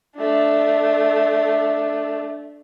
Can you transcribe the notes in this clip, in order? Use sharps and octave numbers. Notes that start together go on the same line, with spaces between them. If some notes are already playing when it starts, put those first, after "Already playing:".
A3 D4